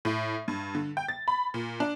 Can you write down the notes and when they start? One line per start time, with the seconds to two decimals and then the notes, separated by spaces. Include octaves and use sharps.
0.05 A2
0.48 G2
0.75 D3
0.97 G5
1.08 A6
1.28 B5
1.54 A#2
1.80 D4